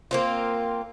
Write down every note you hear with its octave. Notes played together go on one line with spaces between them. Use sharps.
A#3 C4 F4